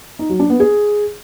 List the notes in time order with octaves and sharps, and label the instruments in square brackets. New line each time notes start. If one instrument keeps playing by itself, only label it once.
[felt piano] D#4
F#3
D4
B3
G#4